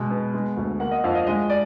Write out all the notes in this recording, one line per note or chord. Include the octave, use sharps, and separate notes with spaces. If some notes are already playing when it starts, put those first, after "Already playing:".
Already playing: B2 G#3
B3
G#3
D2
A#3 F#5
D#5
F2 F5
D#5
G#3 D#5
D5